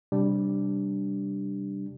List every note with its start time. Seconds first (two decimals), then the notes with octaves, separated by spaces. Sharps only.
0.12 C3 G3 D4